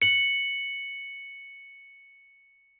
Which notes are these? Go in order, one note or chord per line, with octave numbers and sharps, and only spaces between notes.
C#7 F#7